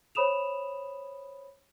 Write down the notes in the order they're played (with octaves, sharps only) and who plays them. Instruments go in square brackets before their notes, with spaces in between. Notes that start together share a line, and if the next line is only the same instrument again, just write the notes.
[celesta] C5 C#5 B5 D#6 E7 F7